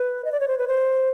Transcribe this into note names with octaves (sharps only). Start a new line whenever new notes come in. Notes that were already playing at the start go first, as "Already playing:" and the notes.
Already playing: B4
D#5
D5
C#5
C5
B4
C5